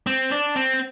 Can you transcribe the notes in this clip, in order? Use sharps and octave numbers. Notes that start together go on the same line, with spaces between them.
C4
D4
C4